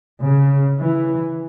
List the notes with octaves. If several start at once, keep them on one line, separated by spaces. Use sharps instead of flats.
C#3
E3